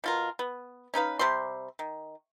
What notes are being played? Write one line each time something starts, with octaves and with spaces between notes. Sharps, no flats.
B2 F4 A#4
B3
C#4 D#4 B4 F5
C3 G3 C4 C6
D#3